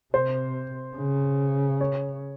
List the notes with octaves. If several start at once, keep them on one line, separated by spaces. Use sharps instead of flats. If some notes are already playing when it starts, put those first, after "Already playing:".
C3 C5
C#3
C#5